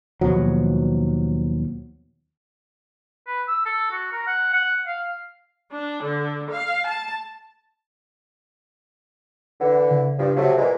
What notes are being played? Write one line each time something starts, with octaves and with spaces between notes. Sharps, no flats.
D#2 B2 F3 F#3
B4
E6
A4
F#4
A#4
F#5
F#5
F5
D4
D3
F5
A5
D3 E3 F#5
C#3
G2 F3
C3 F#3 A3
A#2 E3 G#3